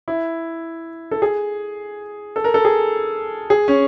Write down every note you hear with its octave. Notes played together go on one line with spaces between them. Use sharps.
E4
A4
G#4
A4
A#4
A4
G#4
G#4
C#4